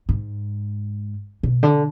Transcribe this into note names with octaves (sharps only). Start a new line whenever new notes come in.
G#2
B2
D3